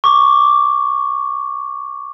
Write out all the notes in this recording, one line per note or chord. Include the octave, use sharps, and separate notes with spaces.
C#6 D6